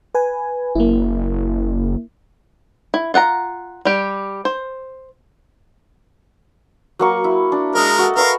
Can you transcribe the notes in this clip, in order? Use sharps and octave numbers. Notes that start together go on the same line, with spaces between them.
B4 G#5
F#1 A#3 E4
E4
F4 F#5 G5 A#5
G3 G4
C5
F#3 A#3 C#6
E4
D4
G#3 A#4 D#5 E5
F#4 A4
A#4 B4 E5 F5 C#6